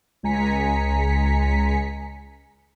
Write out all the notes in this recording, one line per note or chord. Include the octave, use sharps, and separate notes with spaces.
C#2 G#3 G#5 A#5 B6 C#7